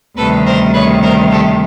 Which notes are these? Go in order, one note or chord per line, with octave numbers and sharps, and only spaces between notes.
D2 C3 D#3 G3 A4 B4
A#4 C5
B4 C#5
A#4 C5
G4 A4